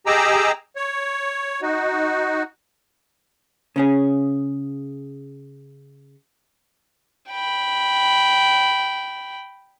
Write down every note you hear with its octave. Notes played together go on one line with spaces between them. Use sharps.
G4 G#4 D#5 A#5 D6 E6
C#5
D#4 F#4
C#3 C#4 G#4
G5 B5